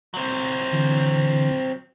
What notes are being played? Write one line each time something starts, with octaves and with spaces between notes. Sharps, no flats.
F#3 C4
D3 E3